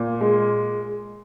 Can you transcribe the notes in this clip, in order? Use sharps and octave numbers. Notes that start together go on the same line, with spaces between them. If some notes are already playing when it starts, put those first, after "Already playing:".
Already playing: A#2
G#3